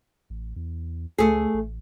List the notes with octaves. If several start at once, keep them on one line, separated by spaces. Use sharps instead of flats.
A1
E2
C#2 A3 G#4
A1